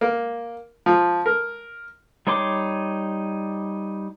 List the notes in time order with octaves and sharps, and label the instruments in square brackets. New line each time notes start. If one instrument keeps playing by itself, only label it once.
[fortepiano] A#3
F3
A#4
[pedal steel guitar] G3 D#4 C#5 C6 D6